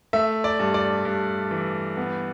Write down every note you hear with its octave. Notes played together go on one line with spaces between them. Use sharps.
A3 E5
D5
G2
D5
G2
E3
B3